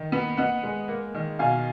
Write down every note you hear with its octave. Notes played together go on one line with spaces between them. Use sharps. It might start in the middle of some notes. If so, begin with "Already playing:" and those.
Already playing: D#3
B3
B3 D#5 F#5
G#3
A#3
D#3
B2 F5 G#5